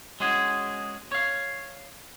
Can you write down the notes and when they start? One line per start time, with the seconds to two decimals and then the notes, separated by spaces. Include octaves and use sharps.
0.20 G#3 C#4 F#4 G#4
1.12 C#5 F5